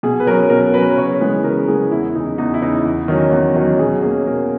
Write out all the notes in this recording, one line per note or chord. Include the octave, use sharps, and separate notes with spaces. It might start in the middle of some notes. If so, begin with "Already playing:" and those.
B2 G#4
B4
F#3 C#4 A#4
B2 A#4
F#3 C#4 B4
C#3 C#5
E3 G#3 B3 B4
C#3 A#4
A#4
E3 G#3 B3 G#4
E2 E4
C#3 E3 D#4
E2 D#4
E4
C#3 E3 D#4
E2
D#3 F#3 C#4
E2
D#3 F#3 C#4
B2 G#4
A#3 C#4 G#4
B2 A#4